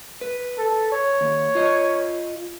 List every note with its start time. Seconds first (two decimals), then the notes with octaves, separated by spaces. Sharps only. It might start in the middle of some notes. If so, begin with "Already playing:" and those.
0.21 B4
0.58 A4
0.92 C#5
1.21 D#2
1.55 F4 D#5